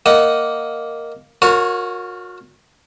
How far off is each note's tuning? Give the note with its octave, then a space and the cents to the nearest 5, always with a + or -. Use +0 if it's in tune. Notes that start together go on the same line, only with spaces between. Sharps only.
A#3 +0 D#5 +0 F#5 +10
F#4 -40 A#4 -5 C#5 +0